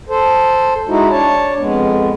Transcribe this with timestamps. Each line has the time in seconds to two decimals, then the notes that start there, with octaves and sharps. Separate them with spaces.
0.09 A4 C5
0.88 G#3 D#4 E4 F#4
1.11 D4 C#5 A5
1.59 F2 G#3 B3